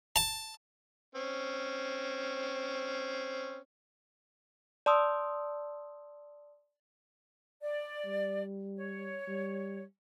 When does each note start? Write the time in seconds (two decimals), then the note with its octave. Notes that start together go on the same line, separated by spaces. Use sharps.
0.16 A5
1.15 C4 C#4
4.86 D5 A5 C6 D#6 E6
7.61 D5
8.06 G3
8.76 C#5
9.28 G3